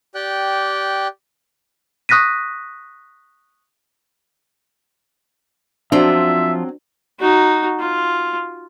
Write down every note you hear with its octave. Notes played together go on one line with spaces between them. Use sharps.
G4 D5 G5 F#6
C#6 D#6 F#6 A#6 B6 D#7
F3 F#3 C4 D4 F4 E5
D#4 F#4
F4